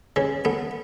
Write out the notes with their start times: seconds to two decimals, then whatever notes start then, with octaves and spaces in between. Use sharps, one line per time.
0.16 C#3 B4
0.45 B3 A4